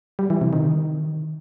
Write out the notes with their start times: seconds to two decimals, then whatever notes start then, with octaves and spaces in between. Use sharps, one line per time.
0.19 G3
0.30 E3
0.41 C3
0.53 D#3